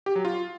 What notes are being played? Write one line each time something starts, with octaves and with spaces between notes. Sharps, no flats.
G4
F#3
F4